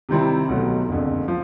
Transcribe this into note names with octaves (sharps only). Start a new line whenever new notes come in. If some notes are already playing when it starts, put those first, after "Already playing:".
C3 D#3 G3 C4 E4
B1 B2 F#3 A3
F#1 F2 D3
F3